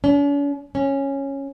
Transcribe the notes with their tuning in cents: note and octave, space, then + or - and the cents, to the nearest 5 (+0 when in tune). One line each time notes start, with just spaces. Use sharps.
C#4 +45
C#4 -10